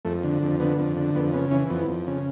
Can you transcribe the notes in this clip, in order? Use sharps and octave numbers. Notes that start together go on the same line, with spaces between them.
F2 A3
D3
F2
D3 B3
F2
D3
F2 B3
C#3 B3
E3 C#4
F2 B3
F2
C#3